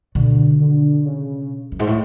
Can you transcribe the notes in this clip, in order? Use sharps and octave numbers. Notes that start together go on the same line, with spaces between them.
B2 D3
D3
C#3
F#2
G#2
A2